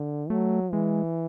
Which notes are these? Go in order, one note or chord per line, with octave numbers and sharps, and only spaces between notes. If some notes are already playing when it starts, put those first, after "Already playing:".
Already playing: D3
F#3 A3
E3 G#3